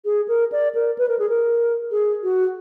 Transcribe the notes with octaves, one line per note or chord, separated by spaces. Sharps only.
G#4
A#4
D5
A#4
B4
A#4
G#4
A#4
G#4
F#4